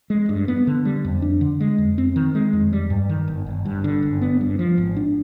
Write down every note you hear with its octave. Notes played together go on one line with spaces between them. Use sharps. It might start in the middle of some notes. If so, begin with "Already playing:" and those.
G#3
G2
B3
D3
G3
F2
D4
D3
G#3
F2
C4
D#3
G#3
F2
G3
G2
D#3
G1
G1
G2
D3
G1
B3
G2
F3
G#1
D4